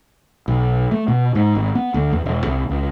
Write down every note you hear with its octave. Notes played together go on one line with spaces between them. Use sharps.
B1
A3
B2
G#2
G#1
B3
D2
E2
E1
C2
C#2